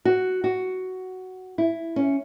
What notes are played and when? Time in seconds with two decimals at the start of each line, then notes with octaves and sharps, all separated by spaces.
0.05 F#4
0.44 F#4
1.58 E4
1.96 C#4